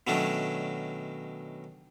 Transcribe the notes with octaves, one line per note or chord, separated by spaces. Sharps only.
B2 D#3 F#3 A3 C#4 D4